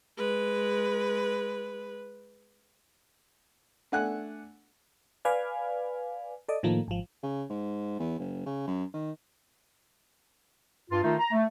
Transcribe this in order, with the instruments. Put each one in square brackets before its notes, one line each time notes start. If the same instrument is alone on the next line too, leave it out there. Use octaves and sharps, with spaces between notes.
[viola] G#3 B4
[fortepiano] A3 D4 F#5 G#5 F#6
[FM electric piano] B4 D5 F5 G#5
A4 D5 D#5
A2 D#3 F3 A3 A#3
G#1 F3
[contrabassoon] C#3
G#2
E2
F#1
C#3
F#2
D#3
[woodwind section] G2 F4
D#3 A3 D#4 F4
A#5
A3